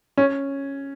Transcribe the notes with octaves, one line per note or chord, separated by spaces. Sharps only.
C#4